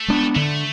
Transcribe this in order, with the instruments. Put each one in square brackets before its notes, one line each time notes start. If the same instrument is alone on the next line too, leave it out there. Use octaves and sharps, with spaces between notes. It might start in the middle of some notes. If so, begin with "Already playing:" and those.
Already playing: [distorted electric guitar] A3
[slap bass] G#3 B3 D4
[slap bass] D3 [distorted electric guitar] A3